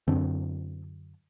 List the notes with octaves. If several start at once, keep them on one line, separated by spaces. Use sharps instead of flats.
F#2 D3 C4 D4